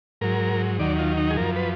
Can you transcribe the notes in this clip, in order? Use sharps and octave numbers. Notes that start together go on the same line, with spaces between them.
G#2 F#3 A#4
D#2 D#3 F#3 D5
F4
D#4
G#4
F#2 F3 A#4
B4